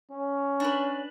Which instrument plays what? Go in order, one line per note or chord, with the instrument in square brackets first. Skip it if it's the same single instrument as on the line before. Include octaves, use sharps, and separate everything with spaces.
[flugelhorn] C#4
[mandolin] D4 B4